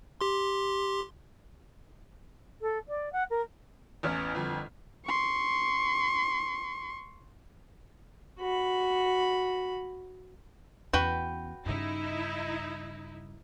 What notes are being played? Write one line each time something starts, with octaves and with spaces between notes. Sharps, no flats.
G4 C6
A4
D5
F#5
A#4
A1 E2 C#4 F6
G1 F2
C6 C#6
F#4 B5
E2 C#4 F#4 B4 G5
G2 C#3 D#4 E4